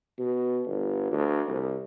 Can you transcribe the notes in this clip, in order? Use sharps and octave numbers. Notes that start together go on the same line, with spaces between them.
B2
G1
D2
C2